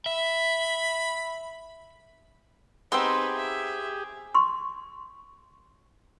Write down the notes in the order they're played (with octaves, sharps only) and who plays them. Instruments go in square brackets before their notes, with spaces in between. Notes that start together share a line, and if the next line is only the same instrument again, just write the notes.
[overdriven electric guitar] E5 [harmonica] B5
[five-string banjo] B3 C4 [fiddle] D#4 B4 [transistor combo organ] G4 G#4 [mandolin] C6 E6
[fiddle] E5
[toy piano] C6 C#6